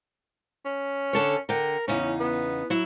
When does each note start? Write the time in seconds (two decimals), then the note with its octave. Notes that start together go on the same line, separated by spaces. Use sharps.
0.65 C#4
1.13 D3 A4 C#5
1.49 D3 A#4 G5
1.88 E2 C#3 C#4 D#4
2.20 B3
2.70 F#3 E4